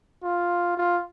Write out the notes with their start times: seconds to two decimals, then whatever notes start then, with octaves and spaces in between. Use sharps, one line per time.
0.23 F4
0.77 F4